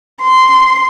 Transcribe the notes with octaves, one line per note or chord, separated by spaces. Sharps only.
C6